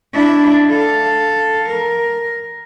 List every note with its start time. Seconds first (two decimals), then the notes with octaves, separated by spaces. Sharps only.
0.14 D4 E4
0.70 A4 F5
1.69 A#4